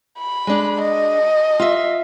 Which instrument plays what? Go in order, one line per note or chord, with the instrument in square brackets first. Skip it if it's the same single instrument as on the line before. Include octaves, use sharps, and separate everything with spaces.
[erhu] B5
[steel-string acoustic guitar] G#3 D4
[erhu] D#5
[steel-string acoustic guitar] F4 E5